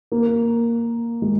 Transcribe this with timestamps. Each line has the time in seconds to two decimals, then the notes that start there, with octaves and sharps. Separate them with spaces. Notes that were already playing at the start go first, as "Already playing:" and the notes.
0.12 A#3
1.22 G#3